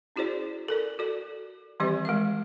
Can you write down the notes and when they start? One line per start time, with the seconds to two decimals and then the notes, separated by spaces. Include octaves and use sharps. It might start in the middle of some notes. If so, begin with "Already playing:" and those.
0.16 C#4 E4 F#4 G#4 C5 D5
0.68 A4 A#4 D5
0.99 F#4 A4 D5
1.80 D#3 E3 G3 C4 G4 D5
2.05 G#3 A#4 E5